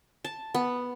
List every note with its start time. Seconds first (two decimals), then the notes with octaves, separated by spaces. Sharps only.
0.25 A5
0.54 B3